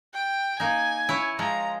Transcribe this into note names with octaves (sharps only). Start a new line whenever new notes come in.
G5
A#3 D#4 G#5
E4 B4 C#5
F3 G#3 F4 A#5